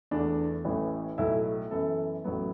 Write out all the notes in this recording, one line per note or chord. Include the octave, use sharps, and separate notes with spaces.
E2 E3 A3 D4
A1 A2 E3
B1 A2 F#3 A3 E4
F#2 E3 B3 A4
A1 A2 F#3 B3